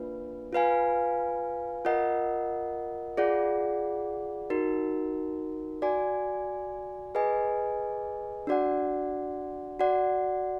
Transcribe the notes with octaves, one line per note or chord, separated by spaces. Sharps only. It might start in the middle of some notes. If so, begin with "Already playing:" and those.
Already playing: A#3 D4 F4 B4
F4 B4 F5 G#5
F4 A#4 D#5 F#5
F4 G#4 D5 F#5
D#4 F#4 A#4
F#4 D5 G#5
G#4 B4 D#5 G#5
D4 F#4 D5 F#5
F#4 D5 F#5